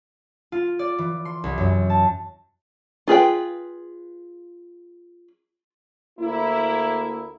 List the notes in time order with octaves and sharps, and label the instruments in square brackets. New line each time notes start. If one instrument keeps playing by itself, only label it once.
[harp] F4
D5
E3
C6
C2
F#2
A5
[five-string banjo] F4 G#4 B4 G5
[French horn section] D2 A#3 E4